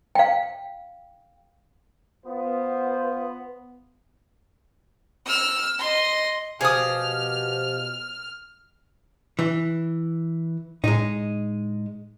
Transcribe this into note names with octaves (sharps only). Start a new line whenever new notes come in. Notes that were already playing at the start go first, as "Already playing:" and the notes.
F5 G5
B3 F4 C5
E6 F6
D#5 C6
B2 F3 G4 G#4 D#6 F6
E3
A2 G#3 D#4